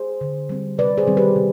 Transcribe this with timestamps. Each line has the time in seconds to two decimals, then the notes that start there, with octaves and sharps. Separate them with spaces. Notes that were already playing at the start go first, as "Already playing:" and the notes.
Already playing: G#4 C5
0.21 D3
0.49 G3 C4
0.78 C3 B4 D5
0.98 G#4 C5
1.07 D#3 G3 C4
1.17 G4 B4
1.36 C3